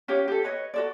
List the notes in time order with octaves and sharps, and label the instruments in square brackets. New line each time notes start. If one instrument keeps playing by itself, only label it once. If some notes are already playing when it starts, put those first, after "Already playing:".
[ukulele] C#4 F4 G4 C#5
G4 A4
B4 C#5 D#5
F#4 A4 D5